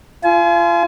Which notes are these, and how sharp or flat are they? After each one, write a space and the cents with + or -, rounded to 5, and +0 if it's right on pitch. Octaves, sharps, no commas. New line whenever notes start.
F4 -30 G#5 +35